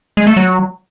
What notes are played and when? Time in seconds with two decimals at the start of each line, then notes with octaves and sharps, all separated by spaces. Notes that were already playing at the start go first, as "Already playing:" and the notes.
0.17 G#3
0.27 A3
0.37 F#3